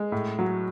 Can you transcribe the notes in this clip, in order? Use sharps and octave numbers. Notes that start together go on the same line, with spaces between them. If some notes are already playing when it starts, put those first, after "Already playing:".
Already playing: G#3
A2
F#3